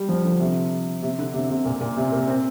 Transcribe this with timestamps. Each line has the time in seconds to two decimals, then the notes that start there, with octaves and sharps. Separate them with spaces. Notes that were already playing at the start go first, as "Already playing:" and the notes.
Already playing: G3
0.09 F3
0.25 D3
0.40 C3
1.02 C3
1.19 D3
1.34 C3
1.50 C3
1.65 A#2
1.81 A#2
1.97 C3
2.12 A#3
2.28 C4